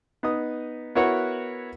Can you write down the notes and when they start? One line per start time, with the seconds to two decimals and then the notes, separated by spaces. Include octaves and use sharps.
0.23 B3 D#4 D#6
0.95 B3 E4 F#4 A#4 C#5 F#5